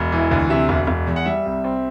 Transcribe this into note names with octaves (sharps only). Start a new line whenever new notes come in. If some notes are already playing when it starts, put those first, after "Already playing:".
Already playing: E1
E3
D2
C3 E5
E1
E1
E2
F#5
G3 E5
C2
C4